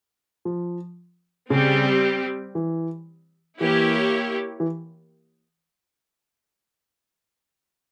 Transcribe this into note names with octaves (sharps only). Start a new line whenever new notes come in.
F3
C#3 G3 C4 G4
E3
E3 A#3 E4 G4 C#5
E3